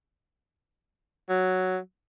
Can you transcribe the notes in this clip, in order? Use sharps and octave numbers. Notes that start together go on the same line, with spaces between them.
F#3